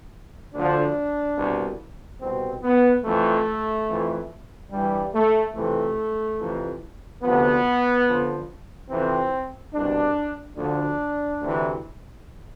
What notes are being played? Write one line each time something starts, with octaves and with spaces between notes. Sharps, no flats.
D2 D3 F3 D4
C2 B2
C2 B2 C4
B3
F2 E3 A3
F2 E3
G2 E3 G3
A3
F2 C3 E3 A3
F2 C3 E3
D2 C3 F3 B3
F2 D3 F3
F2 C3 E3 C4
C2 B2 D4
D2 D3 F3 D4
D2 C3 E3